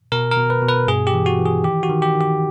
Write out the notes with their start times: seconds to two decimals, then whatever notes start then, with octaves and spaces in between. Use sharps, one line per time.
0.12 B2 A#4
0.31 A#4
0.37 B2
0.50 B4
0.62 B2
0.69 B4
0.87 G2 G#4
1.07 G4
1.14 E3
1.26 F#4
1.39 E3
1.45 G#4
1.64 D#3 G4
1.83 F#4
1.89 D#3
2.02 G4
2.15 D#3
2.21 G4